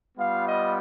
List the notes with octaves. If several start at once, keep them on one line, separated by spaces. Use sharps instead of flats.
G3 B3 F4 F5
D#5